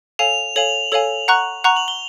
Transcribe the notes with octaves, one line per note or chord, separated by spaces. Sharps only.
A4 C#5 F5 G#5 F7
A4 C#5 F5 G#5 F#7
A4 C#5 F5 G#5 F#7
F#5 A#5 C#6 F#6
F#5 A#5 C#6 F#6 F7
F#7
G7